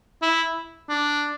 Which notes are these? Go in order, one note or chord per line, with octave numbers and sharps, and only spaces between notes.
E4
D4